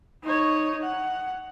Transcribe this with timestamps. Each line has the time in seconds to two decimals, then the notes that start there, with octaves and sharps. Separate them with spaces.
0.24 D#4 C#5
0.83 F#5